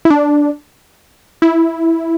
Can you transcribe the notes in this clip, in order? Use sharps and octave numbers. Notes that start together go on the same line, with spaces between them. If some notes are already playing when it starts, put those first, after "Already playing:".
E4
D4
E4